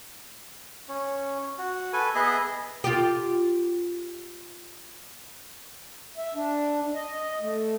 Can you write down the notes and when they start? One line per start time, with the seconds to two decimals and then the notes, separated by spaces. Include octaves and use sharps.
0.89 C#4
1.58 F#4
1.93 A4 B4 G#5
2.15 B3 G#4 D#5 E5
2.84 F4 G4
6.17 E5
6.35 D4
6.95 D#5
7.41 A3